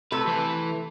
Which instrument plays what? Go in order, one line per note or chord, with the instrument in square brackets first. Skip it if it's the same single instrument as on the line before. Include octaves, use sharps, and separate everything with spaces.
[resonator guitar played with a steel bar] C3 A3 A4 [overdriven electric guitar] B4
[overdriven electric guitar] E3 B4